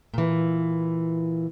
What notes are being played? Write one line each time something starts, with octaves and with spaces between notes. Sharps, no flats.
A#2 E3